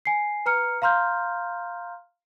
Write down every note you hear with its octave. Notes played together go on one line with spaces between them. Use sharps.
G#5 C7
B4 A#5 F6 C#7
F5 A#5 C6 F6 G6